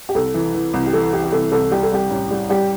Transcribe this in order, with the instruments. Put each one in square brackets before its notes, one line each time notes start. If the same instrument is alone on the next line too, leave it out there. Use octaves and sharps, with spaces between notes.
[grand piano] G4
[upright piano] C2 [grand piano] A4
[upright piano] E3
E3
C2
[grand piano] G4
[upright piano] E3 [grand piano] A4
[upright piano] E3 [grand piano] G4
[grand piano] G4
[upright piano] C2 [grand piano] A4
[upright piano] C2 [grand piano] A4
[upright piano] G3 [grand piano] G4
[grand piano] A4
[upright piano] G3 [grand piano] G4
[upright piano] A1
G3
[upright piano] G3 [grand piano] G4